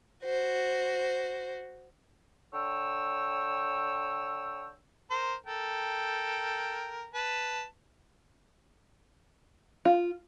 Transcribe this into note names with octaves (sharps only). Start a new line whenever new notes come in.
F#4 C5
D3 C#5 G5 E6
A#4 C5
A4 A#4 G5
B4 A5
F4